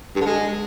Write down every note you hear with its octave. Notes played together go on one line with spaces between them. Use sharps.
G2
D3
G#3